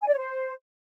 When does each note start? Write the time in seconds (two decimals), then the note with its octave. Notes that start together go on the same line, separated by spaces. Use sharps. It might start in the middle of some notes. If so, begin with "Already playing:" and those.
0.02 G#5
0.07 D5
0.12 C#5
0.17 C5